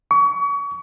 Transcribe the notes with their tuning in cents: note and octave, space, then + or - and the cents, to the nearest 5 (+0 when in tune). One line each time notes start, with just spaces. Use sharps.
C#6 +35